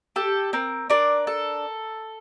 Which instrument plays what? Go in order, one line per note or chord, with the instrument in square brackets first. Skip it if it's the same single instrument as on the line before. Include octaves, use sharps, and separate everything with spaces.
[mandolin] G4 A4
C4 A#4
D4 A#4 D5
A4